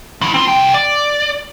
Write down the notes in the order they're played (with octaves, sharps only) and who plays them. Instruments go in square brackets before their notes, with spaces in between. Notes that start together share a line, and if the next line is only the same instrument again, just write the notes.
[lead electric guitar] F3 E4
C4 F4
C2 G5
D5